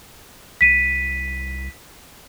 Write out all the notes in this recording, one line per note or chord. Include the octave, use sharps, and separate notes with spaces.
C2 B6 D#7